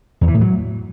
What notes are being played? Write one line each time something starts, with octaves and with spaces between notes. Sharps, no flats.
E2
E3
A2
F#3